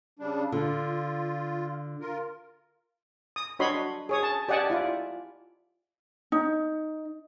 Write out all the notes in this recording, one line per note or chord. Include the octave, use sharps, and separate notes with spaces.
C#3 G3 D4
D3 F4
F4 A#4
D#6
D4 F#4 C#5 D#5 B5 C6
G#4 C#5 D#6
A5
G4 D5 D#5 F#5 G#5 A5
E4 F4 D5
D#4